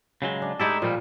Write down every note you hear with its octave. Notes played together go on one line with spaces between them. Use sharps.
C#3 F#3 G#3
D4
G#3 A3 D#4 E4 G4 A4
A#2 F3 G3